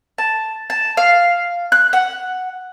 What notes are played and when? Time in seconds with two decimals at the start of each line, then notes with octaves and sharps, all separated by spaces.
0.18 A5
0.70 A5
0.97 F5
1.72 F#6
1.93 F#5